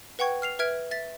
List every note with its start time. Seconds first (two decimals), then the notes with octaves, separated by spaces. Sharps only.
0.19 B4 F#5 G5 C#6 G#6
0.42 F6 C7 F7
0.59 B4 E5 F6 G#6 D7
0.91 E5 A6 B6